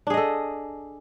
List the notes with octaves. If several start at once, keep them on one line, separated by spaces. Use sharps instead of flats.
D4 G#4 A4 D#5